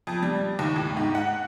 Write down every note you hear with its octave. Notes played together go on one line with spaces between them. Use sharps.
F2
G3
D#2
A2
G#2
F#5